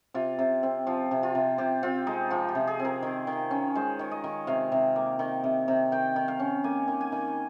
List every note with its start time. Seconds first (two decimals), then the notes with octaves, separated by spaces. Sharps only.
0.14 C3 F4
0.39 C3
0.63 C4
0.87 F3 F4
1.11 C3
1.23 F4
1.35 C3
1.58 C3 G4
1.83 C4 F4
2.07 G#3 D#4
2.30 F3 F4
2.49 G4
2.55 C3
2.67 G#4
2.79 C4
2.85 A#4
3.02 D#3
3.27 D#3
3.51 C#4
3.75 G#3 C5
3.99 D#3 C#5
4.11 D#5
4.24 D#3
4.47 C3 F5
4.72 C3
4.96 A#3
5.19 D#3
5.44 C3
5.68 C3
5.92 D#3 G5
6.16 D#3
6.28 F5
6.39 C#4
6.64 A#3 G#5
6.88 D#3
7.01 G#5
7.12 D#3